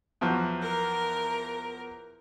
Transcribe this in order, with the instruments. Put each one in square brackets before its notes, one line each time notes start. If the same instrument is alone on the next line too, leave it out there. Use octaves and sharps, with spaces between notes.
[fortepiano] E2 F3 F#3
[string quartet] A#4